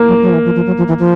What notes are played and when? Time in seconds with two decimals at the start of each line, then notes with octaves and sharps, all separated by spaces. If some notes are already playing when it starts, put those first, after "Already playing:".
Already playing: A#3
0.08 F#3
0.22 F#3
0.30 F3
0.34 E3
0.45 F3
0.56 F3
0.66 F#3
0.78 F3
0.88 E3
0.99 F3